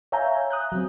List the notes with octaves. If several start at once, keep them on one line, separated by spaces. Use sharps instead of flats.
C#5 E5 F5 G#5 A#5 G6
D#6 F#6 G6
F#3 C4